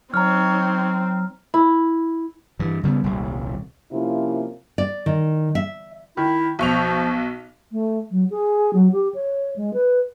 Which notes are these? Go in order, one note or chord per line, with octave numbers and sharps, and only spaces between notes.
F#3 C4 D#4 C#5 A#5 F6
E4
G2 E3
C#3 G3 G#3 B3
D#1 C2 G3
C3 F3 A#3 C#4 E4 F4
D5
D#3
E5
D#3 E4
B1 F3 C#6 F7
A3
F#3
G#4
F#3
G4
C#5
G#3
B4